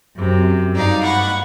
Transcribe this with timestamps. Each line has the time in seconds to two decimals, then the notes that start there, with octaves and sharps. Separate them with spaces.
0.17 F#2 C3
0.75 G2 D#4 D5 F5
1.03 F#5 B5 C#6